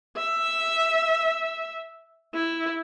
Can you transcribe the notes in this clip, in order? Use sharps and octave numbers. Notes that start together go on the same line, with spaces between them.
E5
E4